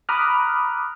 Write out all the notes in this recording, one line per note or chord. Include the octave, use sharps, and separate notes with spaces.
A#5 B5 D6 D#6 F6 F#6